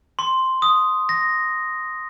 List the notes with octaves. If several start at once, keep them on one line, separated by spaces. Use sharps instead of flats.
C6
D#6
A#6